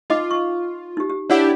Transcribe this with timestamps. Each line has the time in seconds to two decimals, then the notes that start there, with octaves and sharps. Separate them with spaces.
0.10 D#4 F4 D#5 D6
0.31 C#6
0.97 D#4 G4
1.10 G4
1.30 D4 E4 G4 C#5 D5 F#5